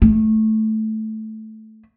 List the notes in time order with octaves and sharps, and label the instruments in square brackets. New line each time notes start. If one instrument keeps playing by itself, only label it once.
[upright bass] A3